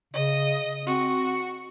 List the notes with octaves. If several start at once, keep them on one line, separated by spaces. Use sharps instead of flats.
C#3 D#5
C4 F#4